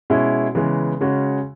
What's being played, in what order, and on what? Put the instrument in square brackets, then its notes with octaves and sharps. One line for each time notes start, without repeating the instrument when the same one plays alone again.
[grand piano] B2 G#3 C#4 E4
C#3 E3 G#3 B3
C#3 G#3 C#4 F#4